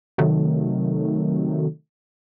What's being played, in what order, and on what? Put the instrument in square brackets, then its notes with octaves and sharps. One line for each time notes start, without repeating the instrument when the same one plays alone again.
[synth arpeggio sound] C3 D#3 F#3 A3